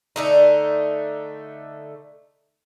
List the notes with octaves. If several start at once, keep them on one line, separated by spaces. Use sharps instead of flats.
D3 A3 D#4